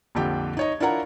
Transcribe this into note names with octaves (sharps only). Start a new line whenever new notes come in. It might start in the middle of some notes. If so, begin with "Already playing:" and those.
A#1 F2 D3 G4 G5
D#4 C#5 D#5
D4 E4 F4 A#4 F#5 A#5